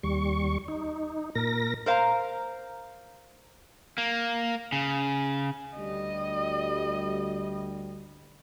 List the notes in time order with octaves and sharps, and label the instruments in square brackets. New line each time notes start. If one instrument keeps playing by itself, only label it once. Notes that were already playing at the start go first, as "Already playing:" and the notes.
[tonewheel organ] D#2 G3 C#6
D#4
A#2 A#4 A#6
[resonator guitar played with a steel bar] A#4 C5 F5 G#5 A#5
[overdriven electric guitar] A#3
C#3
[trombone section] D2 G3 [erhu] D#5